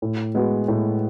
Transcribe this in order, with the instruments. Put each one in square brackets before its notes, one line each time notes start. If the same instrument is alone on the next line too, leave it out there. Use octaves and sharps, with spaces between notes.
[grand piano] A2
G#3 B3 F#4
A2